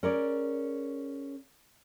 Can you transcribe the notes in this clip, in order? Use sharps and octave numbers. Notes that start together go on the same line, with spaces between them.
C#4 G#4 A#4 C#5 D5